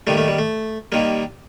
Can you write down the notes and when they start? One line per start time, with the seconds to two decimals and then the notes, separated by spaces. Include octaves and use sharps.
0.07 D#2 D#3 G3 A3
0.17 A3
0.28 G3
0.39 A3
0.92 D#2 D#3 G3 A#3